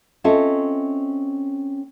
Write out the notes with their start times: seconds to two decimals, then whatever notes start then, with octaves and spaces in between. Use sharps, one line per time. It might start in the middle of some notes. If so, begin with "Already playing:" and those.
0.24 C4 C#4 F4 A4 D#5 E5